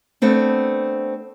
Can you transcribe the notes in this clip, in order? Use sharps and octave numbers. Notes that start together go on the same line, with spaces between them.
A3 B3 C4 D4